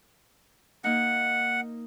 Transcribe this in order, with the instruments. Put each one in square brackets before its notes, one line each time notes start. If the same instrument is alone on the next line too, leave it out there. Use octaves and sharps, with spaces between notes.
[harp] A#3 D#4 [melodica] F#5